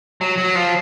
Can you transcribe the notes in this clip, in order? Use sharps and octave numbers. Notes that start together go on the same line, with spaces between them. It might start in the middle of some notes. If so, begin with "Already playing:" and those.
F#3
F#3
F3